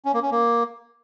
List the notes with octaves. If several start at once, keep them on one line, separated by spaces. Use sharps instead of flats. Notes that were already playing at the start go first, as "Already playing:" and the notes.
C#4
A#3
C#4
A#3